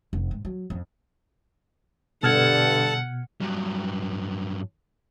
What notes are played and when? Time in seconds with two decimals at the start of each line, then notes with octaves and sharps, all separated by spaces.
0.13 F1
0.31 G#2
0.45 F#3
0.70 F2
2.23 G2 B2 D3 A4 F#5 A5 F6 G#6
3.41 G2 F#3